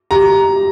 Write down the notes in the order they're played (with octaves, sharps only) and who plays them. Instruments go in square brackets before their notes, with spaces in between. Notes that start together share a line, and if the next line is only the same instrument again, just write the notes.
[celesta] G4 [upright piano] A#5